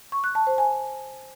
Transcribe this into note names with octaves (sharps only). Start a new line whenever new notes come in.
C#6
F#6
A5
C5
G#5